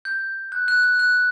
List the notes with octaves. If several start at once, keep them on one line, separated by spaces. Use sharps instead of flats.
G6
F#6
F#6
F#6
F#6